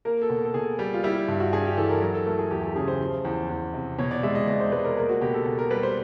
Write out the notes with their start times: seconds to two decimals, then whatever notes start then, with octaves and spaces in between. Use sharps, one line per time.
0.05 A#3 A#4
0.22 A4
0.30 B2
0.45 A4
0.54 B2 G#4
0.79 G3
0.93 F4
1.03 G3 E4
1.28 G2
1.40 F#4
1.53 G2 G#4
1.65 G4
1.77 E3 A4
1.89 A#4
2.02 F#3 A#4
2.14 A4
2.26 A3 A#4
2.39 G#4
2.51 E2 G4
2.63 G4
2.76 C#3 G#4
2.88 C5
3.00 F3
3.25 E2
3.49 E2
3.74 C3
3.99 B2 C#5
4.11 D5
4.23 G#3 E5
4.35 D#5
4.47 B2 D5
4.60 C5
4.72 G#3 B4
4.84 A#4
4.97 A#3 A#4
5.09 F#4
5.21 B2 G4
5.34 A4
5.46 B2
5.59 A#4
5.70 G3 B4
5.83 C5